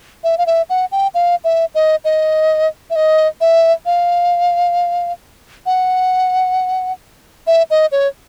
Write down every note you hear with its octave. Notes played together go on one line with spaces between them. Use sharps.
E5
F5
E5
F#5
G5
F5
E5
D#5
D#5
E5
D#5
E5
F5
F#5
E5
D#5
C#5